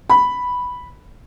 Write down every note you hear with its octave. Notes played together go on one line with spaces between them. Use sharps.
B5